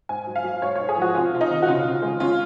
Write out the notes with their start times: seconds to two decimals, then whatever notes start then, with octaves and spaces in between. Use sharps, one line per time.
0.09 G#2 G#5
0.27 F#3
0.36 F5
0.44 F#3
0.62 G#2 C#5
0.75 C#5
0.80 G#2
0.89 G#4
0.97 F3 F#4
1.15 C3 F4
1.33 C3 F4
1.41 D#4
1.50 D#3
1.63 F#4
1.68 C#3 F4
1.85 C#3
2.02 G#3
2.20 C#4 F4